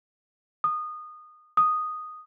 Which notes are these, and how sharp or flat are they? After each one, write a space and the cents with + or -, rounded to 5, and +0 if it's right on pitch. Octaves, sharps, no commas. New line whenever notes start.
D#6 -20
D#6 -5